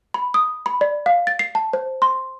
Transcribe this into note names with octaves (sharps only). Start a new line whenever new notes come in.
B5
D#6
B5
D5
F5
A6
C7
A5
C5
C6